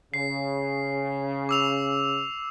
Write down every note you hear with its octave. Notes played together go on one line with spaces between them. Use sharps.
C#3 C7
D6 E6 F7